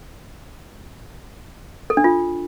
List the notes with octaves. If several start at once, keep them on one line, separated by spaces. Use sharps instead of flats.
A4
D4
F4